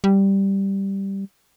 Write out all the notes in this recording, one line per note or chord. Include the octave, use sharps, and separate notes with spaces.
G3